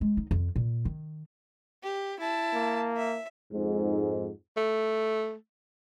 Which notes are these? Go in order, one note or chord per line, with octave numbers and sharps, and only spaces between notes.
G#3
D#4
F2
A#2
D#3
G4
E4 A5
A#3
E5
F2 G#2
A3